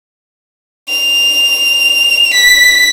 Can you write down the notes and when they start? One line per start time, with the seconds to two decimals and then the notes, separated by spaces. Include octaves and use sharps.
0.89 F7
2.34 B6